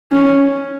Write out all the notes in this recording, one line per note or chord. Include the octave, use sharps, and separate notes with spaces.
C#4